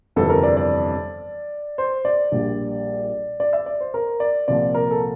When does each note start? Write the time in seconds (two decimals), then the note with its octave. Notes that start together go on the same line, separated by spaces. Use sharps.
0.16 G1 F2 C3 E3 G3 A4
0.30 A#4
0.43 D5
0.57 D5
1.78 C5
2.05 D5
2.32 A#1 A#2 G3
3.40 D5
3.53 E5
3.66 D5
3.80 C5
3.94 A#4
4.20 D5
4.48 C2 A#2 F3 D5
4.75 A#4
4.91 A4